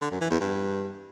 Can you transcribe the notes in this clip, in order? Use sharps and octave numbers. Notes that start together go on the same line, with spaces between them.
D3
F#2
E3
E2
G2